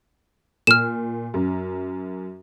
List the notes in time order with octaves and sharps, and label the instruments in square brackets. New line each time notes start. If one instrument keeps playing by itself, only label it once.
[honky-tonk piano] A#2 [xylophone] F6 E7
[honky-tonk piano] F#2